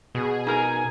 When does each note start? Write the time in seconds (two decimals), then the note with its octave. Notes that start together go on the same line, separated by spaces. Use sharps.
0.15 B2 G#4
0.47 D#4 A#4 G#5 A#5